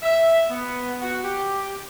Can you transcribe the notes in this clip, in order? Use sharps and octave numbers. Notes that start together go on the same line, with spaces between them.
E5
B3
F#4
G4